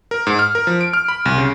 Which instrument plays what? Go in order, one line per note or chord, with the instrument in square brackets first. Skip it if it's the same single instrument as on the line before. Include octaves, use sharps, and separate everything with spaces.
[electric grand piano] A#4
G#2
F6
A#4
F3
D7
F6
B5
C2
C#3